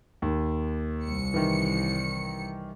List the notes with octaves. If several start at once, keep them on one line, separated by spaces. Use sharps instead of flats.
D#2
C2 C#7
D#3 E3